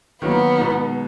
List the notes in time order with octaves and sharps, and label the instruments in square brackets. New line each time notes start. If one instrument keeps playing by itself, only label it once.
[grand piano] D#3 F#3 A#3 [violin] B3
[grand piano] B2 G#3 D#4